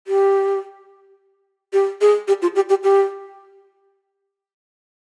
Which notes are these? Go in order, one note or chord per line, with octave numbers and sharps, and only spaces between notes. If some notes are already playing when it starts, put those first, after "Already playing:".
G4
G4
G#4
G4
F4
G4
G4
G4